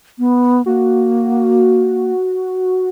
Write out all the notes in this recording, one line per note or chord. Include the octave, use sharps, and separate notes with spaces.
B3
A#3 F#4